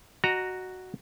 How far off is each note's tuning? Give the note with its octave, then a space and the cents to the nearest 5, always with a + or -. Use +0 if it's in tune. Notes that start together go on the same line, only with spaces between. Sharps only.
F#4 +0 D#5 -30 A#5 +0